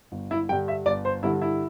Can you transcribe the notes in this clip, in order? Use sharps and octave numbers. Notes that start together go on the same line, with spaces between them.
G1
E4
G2 D3 G3 G5
E5
G1 D5
C5
G2 D3 G3 E4
E4